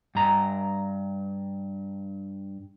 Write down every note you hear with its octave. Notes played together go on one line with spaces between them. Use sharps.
G2 A#5